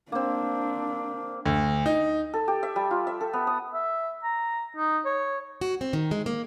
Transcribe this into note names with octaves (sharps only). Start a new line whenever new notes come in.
A#3 C4 D4
D2
D#4
A4
G4
E5
G3
F4
E5
A4
B3
D#6
E5
A#5
D#4
C#5
F#4
C4
D#3
G#3
A#3